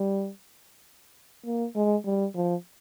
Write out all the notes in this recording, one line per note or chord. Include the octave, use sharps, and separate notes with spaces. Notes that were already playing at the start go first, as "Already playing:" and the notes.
Already playing: G3
A#3
G#3
G3
F3